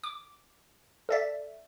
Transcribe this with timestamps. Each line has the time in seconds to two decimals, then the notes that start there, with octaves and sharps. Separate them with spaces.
0.04 D6
1.09 A4 D5 E5